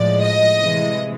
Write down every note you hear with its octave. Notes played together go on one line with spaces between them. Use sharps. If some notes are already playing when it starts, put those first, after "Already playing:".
Already playing: A2 F3 G#3 D5
D#5
C3 E3 G#3